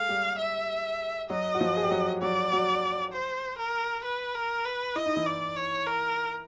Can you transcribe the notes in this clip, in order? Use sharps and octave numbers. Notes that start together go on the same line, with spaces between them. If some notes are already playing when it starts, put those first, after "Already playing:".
Already playing: G#3 G#4 A4 F5
G3 G4
E5
F#3 F#4 D#5
F#4
F3 F4
G#4
G4
F#3 F#4
F#3 F#4 D5
F#3 F#4
C5
A#4
B4
A#4
B4
E4 D#5
D#4
E3 E4
D5
C#5
A#4